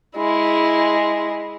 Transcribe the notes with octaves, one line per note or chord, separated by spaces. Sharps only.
G#3 E4